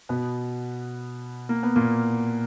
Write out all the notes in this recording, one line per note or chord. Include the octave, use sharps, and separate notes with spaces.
B2 B3
A#3
B3
A#2 A#3